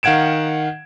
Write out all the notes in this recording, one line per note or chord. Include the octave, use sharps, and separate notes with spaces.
D#3 F5 F#5 G#6 D7 E7